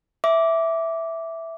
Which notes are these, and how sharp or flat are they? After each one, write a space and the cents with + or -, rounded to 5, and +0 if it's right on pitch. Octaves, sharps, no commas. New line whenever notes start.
E5 +0 D6 -10